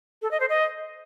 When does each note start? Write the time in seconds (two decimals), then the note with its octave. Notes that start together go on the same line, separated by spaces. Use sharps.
0.22 A4
0.31 D#5
0.40 C5
0.49 D#5